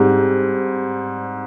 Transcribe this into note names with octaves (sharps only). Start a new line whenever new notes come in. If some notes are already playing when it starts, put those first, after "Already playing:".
Already playing: G#2 G3 C4